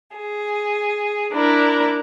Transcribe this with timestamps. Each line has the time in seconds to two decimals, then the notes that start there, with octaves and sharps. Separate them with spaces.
0.15 G#4
1.32 D4 E4 A#4